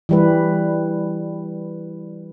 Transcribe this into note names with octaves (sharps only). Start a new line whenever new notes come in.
E3 G3 B4